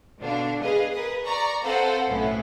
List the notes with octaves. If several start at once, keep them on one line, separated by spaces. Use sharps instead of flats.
B2 D3 D4 F5
G#4 B4 D#5 F5
A#4 B4 D#6
D5 A#5 C#6
C4 A4 B4 C5 F5 F#5
B1 A2 B3 C#4 E4